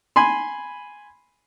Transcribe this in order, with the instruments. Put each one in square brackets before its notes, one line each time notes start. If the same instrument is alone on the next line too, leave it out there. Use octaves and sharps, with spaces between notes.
[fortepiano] G#5 B5 C6